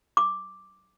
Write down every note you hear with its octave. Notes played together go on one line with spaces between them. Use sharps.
D6